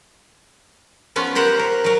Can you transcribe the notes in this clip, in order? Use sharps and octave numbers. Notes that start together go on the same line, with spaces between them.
F3 B3 C#4 F4
G4 A#4 C5 F#5
A#4
F#3 A#4